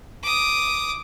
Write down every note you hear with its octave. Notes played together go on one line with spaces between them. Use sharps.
D6 D#6